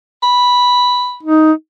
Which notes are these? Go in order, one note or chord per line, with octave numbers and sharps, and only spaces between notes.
B5
D#4